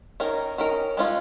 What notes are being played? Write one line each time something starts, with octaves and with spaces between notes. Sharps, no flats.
D#3 C#4 A#4
D#3 C#4 A#4
G#3 C#4 F4